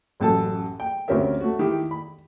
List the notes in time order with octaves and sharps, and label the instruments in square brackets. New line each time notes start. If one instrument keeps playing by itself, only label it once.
[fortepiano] A1 F#2 A4 A5
G5
D2 C4 C#4 G4 A#4 E5
A3 F#4
D#3 E4 G4
B5